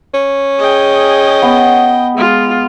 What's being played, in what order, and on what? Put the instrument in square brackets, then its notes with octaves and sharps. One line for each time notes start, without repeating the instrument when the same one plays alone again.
[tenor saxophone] C#4
[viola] G#4 [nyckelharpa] D#5 G5
[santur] B3
[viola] G#3 F4